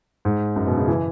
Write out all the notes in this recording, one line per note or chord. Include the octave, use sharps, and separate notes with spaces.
G#2
F#2
B2
C#3
E3